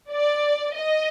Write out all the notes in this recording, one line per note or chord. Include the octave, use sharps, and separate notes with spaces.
D5
D#5